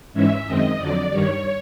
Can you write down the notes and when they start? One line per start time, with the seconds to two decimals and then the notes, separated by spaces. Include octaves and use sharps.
0.13 G#2 E3 G#3 C#4 E5
0.46 F#2 D#3 G#3 C4 D#5
0.78 F2 D3 F#3 D5
1.10 G2 D#3 G3 C#5